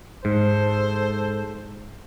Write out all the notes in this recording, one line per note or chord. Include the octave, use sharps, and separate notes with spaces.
G#2 A4 C5